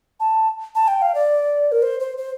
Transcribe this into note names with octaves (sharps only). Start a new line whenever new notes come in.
A5
A5
G5
F5
D5
A#4
C5
C5
C5